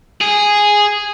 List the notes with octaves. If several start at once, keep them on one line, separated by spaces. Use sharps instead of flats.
G#4